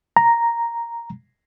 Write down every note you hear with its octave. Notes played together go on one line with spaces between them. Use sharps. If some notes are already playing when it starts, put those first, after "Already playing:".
A#5